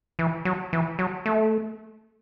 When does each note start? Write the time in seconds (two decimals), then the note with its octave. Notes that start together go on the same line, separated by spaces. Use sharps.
0.19 E3
0.45 F#3
0.73 E3
0.99 F#3
1.26 A3